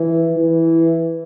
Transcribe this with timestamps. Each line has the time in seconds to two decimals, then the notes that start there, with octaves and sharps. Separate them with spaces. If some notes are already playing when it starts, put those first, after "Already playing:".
Already playing: E3
0.37 E3